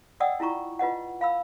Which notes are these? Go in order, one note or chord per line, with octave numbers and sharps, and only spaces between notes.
D5 D#5 F#5 G5 D#6 E6
E4 F4 A#5 C#6
F4 B4 D#5 F#5
F5 B5 E6